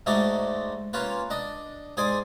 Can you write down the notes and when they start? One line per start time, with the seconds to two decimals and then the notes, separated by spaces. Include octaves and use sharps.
0.06 G#2 G#3 A3 D#4 F#4 D5
0.93 A#3 C#4 F4 B4
1.30 D4 D#5
1.97 G#2 G#4 D5 G#5 C6 D#6